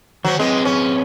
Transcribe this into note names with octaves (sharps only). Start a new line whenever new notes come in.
D#3 F#3 C5
G#3 C4 G#4 B4
C#4